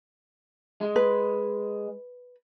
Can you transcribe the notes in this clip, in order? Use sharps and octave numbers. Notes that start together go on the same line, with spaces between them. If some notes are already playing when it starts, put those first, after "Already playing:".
G#3
B4